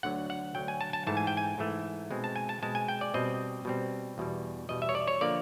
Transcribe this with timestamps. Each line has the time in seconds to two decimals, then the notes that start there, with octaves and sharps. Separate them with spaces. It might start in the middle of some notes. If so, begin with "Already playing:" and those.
0.03 D2 D3 F#3 F#5
0.30 F#5
0.55 D2 D3 F#3 G5
0.68 G#5
0.81 A5
0.93 A5
1.07 G#2 E3 A3 A5
1.17 G#5
1.27 G5
1.37 G#5
1.58 G#2 E3 A3
2.11 B2 G#3 C4
2.24 A5
2.36 G#5
2.49 A5
2.62 B2 G#3 C4 A5
2.75 G#5
2.88 G5
3.01 D5
3.14 B2 G3 C4 D#5
3.65 B2 G3 C4
4.18 E2 B2 G3
4.69 E2 B2 G3 D#5
4.82 E5
4.89 C#5
4.95 D5
5.08 C#5
5.21 D3 F3 A#3 D5